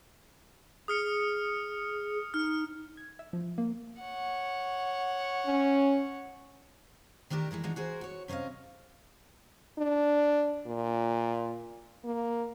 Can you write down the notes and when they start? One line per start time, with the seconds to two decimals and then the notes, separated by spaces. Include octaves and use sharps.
0.88 G#4 D#6 F6 C#7
2.34 D#4 F6
2.97 G#6
3.19 E5
3.33 F3
3.58 A#3
4.01 C#5 F#5
5.46 C#4
7.30 D#3 A3 D4 G4 A#4
7.51 E3 G#3 E4 A#4
7.63 G#3 A#3 D4 D#4 F#4
7.76 F#4 G#4 A#4 C5
8.01 F#4 C#5
8.28 C3 C#4 C5 D#5 F5
9.78 D4
10.66 A#2
12.05 A#3